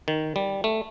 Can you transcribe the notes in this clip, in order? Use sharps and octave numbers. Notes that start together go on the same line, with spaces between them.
D#3
G3
A3